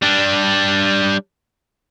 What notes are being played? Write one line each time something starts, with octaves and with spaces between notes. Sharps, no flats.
G3 D4